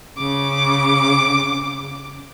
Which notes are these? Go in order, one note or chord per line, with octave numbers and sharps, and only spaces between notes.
C#3 D6